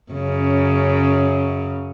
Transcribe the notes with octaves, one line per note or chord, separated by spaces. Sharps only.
F#2 C#3